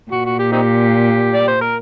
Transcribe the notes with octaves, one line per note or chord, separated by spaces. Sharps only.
A#2 F#4
F#4
G4
C4 D#4 G4
D5
C5
A#4